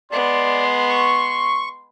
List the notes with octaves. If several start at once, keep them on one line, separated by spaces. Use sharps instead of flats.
G#3 B3 D5 C6
C#6